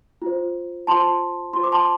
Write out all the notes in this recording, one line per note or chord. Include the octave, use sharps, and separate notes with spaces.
F4 C5
F4 C5 A5 C6
F4 C5 C6
D6
A5 C6